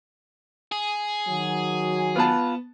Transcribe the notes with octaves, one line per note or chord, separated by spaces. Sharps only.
G#4
D#3 F#3 G#5
B3 F4 B4 A5